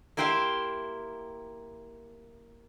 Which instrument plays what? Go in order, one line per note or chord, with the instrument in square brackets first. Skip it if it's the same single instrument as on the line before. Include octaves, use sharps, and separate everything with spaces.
[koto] A#3 E4 G4 C5 E5 F5